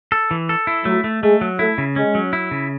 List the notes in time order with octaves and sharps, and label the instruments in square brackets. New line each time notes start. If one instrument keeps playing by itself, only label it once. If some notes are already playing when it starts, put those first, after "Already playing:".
[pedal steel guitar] A4
E3
A4
E4
[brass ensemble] F#3 [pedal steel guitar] A3
[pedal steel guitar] A3
[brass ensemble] G#3 [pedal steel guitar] A3
[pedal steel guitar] F#3
[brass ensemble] A3 [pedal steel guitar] E4
[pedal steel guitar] C#3
[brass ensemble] G#3 [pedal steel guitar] C#4
[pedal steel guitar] F#3
E4
C#3